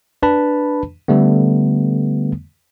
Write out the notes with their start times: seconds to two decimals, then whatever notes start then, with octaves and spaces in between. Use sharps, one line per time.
0.23 D4 B4 A5 B5
1.08 D3 G3 A3 B3